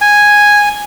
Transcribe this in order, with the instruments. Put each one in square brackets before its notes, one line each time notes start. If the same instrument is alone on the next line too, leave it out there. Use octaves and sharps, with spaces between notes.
[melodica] G#5